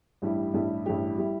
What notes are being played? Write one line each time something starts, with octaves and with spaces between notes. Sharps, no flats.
A1 G2 G3 E4 G4
A1 G2 G3 E4 G4
A1 G2 G3 E4 G4
G3 E4 G4